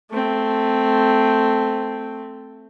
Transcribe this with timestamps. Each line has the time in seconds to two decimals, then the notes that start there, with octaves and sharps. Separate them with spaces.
0.11 A3 C4